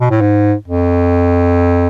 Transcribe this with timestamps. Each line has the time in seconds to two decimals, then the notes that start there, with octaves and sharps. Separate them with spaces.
0.01 B2
0.11 A2
0.21 G#2
0.68 F2